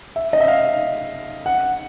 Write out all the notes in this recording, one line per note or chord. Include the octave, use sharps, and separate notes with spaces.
E5
D#5
E5
F5
F#5